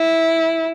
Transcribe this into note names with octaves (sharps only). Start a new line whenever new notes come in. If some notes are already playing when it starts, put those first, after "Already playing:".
Already playing: E4